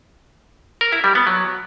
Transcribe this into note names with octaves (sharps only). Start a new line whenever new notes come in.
A#4
E4
G3
B3
F#3